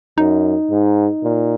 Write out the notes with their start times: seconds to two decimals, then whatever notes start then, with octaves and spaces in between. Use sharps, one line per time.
0.18 F#2 D#4
0.70 G#2
1.24 A#2